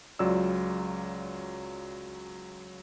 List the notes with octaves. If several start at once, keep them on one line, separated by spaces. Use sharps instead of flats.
C#2 F#3 F4 D5 E6